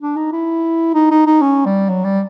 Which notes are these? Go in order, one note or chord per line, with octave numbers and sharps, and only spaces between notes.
D4
D#4
E4
D#4
D#4
D#4
C#4
G3
F#3
G3